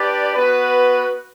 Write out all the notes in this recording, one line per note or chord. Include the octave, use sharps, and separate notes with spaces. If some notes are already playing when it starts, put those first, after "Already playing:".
Already playing: D4 G4 B4 D5
B3 F#4 B4